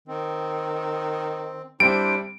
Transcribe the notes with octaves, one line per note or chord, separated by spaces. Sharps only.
D#3 C4
G3 C4 D4 E4 C5 D7